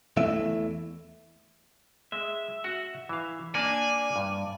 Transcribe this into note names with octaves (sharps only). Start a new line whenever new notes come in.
E2 E3 A3 E5
G#3 E5
F#4 F#5
E3 F5
A#3 D4 D5 G#5 A5
G2